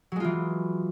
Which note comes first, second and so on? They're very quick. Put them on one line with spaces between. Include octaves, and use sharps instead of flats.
F#3 G#3 F4 E3